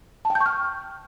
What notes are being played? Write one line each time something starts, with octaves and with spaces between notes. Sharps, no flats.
A5
G5
G6
C#6
F6